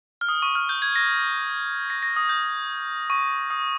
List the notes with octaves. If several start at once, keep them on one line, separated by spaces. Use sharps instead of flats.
F6
D#6
C#6
F6
G6
G#6
A#6
A#6
A#6
D#6
G6
C#6
D#6